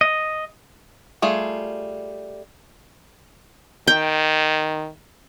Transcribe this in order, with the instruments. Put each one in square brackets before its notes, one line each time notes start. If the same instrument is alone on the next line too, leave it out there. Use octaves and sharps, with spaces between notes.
[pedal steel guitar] D#5
[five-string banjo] G3 A3 F4 G#4
[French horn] D#3 [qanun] G5